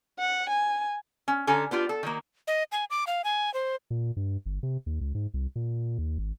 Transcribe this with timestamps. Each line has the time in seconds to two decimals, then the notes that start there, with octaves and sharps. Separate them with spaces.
0.19 F#5
0.49 G#5
1.28 C#4
1.47 D3 C#4 A4 G#5 A#5
1.71 B3 D4 F4 G4
1.89 A4
2.03 D#3 F#3 A#3
2.47 D#5
2.72 G#5
2.90 D6
3.07 F5
3.24 G#5
3.54 C5
3.90 A#2
4.17 G2
4.46 G1
4.63 C3
4.86 D#2
5.01 C#2
5.15 G#2
5.34 C2
5.56 A#2
5.98 D#2
6.18 G#1